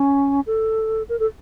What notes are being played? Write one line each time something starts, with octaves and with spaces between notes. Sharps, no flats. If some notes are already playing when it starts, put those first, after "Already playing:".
Already playing: C#4
A4
A#4
A4